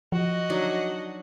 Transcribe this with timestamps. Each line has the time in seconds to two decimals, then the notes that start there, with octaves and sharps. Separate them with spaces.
0.12 F3 F#4 D#5
0.50 F#3 D4 D#4